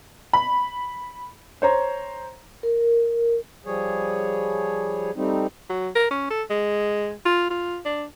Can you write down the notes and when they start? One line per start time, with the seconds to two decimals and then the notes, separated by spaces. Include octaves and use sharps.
0.33 B5
1.62 C5 C#5 A#5
2.63 A#4
3.66 F3 G3 G#4 C#5
5.16 G3 A3 C4 D#4
5.70 F#3
5.95 A#4
6.11 C#4
6.30 A4
6.50 G#3
7.25 F4
7.50 F4
7.85 D4